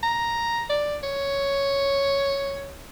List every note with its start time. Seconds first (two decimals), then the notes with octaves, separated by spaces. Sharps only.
0.03 A#5
0.70 D5
1.03 C#5